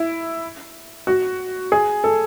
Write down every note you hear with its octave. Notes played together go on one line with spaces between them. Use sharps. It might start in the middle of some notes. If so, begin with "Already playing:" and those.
Already playing: E4
F#4
G#4
A4